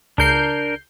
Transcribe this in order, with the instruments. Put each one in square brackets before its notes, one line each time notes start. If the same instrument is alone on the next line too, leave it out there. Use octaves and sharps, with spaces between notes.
[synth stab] C#2 G6 C7 [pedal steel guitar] D4 A#4